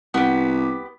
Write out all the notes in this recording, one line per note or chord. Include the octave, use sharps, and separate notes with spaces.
C2 B3 G4